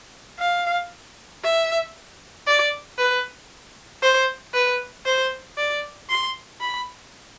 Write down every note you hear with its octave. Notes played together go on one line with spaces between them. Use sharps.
F5
E5
D5
B4
C5
B4
C5
D5
C6
B5